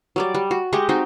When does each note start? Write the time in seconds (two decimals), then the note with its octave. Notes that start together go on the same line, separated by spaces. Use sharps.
0.16 F#3 G3 D5
0.35 G3
0.51 F#4
0.73 G#3 G4 D#5 C#6
0.89 C4 D#4 F#4 G4